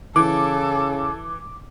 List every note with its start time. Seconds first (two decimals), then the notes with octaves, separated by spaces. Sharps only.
0.16 C#3 E3 A4 D6